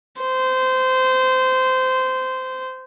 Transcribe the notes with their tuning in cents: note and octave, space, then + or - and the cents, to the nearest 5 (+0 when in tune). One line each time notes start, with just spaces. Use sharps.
C5 -20